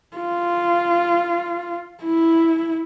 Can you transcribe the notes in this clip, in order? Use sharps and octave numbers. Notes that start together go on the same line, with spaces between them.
F4
E4